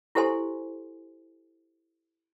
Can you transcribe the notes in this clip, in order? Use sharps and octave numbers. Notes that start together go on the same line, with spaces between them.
E4 G4 A4 C5 G#5 C6